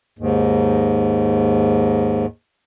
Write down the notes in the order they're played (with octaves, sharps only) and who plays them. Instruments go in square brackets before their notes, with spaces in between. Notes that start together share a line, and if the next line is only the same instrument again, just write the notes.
[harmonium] D#2 G#2